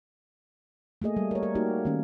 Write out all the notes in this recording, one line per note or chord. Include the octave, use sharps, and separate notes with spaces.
A3 A#3 G#4 D#5
G3
A#4 C#5
A#4
A#3 D#4 F#4 G4
D#3 A3 C#4